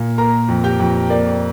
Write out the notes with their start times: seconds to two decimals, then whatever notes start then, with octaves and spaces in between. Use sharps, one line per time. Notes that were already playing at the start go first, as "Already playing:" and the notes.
Already playing: A#2
0.18 A#3 A#4 A#5
0.48 F2
0.64 G4 G5
0.79 F2
1.10 A#3 D5